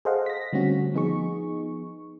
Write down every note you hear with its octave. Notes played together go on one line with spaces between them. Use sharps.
G#4 A4 C5 D#5 F5 F#5
A#6 B6
D3 G3 A3 C4 C#4 F#4
F3 B3 D#4 G#4 C#6